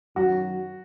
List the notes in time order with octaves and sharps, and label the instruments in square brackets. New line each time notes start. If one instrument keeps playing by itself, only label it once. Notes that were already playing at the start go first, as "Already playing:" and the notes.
[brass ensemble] F#2 D#3 F#3 [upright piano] F#4